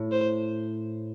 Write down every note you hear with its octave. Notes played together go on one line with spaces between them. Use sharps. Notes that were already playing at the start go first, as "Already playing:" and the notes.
Already playing: A2
C5